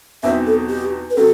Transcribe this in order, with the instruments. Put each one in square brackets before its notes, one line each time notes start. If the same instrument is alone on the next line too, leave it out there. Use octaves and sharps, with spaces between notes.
[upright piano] E2 B2 F#3 C4 D#4 [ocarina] E5
[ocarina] A4
G4
B4
[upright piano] C3 F#3 [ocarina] A4